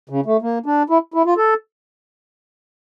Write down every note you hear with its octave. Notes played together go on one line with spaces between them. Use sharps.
C#3
A3
A#3
D4
E4
E4
F4
A4